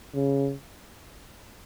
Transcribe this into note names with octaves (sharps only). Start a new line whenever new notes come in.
C#3